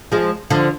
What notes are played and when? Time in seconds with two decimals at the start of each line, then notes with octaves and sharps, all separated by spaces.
0.12 F3 G#3
0.50 D3 F3